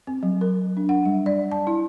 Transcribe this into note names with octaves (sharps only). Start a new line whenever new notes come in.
C4
F#3
A#4
D4
F#5
G3
D5
A5
E4